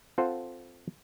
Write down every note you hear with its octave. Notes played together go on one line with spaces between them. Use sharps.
C4 F4 A4 C5 F#5